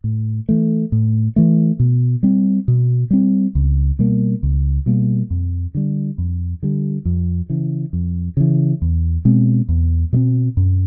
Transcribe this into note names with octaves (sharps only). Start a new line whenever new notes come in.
A2
E3 A3
A2
E3 A3
B2
G3 C4
B2
G3 C4
C#2
B2 G3 A#3
C#2
B2 G3 A#3
F2
D3 G3
F2
D3 G3
F2
C#3 E3
F2
C#3 E3
E2
B2 G#3 C4
E2
B2 G#3 C4
F#2